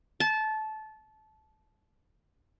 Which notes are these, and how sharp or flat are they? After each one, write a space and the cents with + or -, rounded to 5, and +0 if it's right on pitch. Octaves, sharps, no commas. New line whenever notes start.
A5 -20